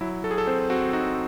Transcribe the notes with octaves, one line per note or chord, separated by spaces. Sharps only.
F#3 E4
F#3 A4
G#4
A4
C4 C5
C4 F#4
D#4 F#4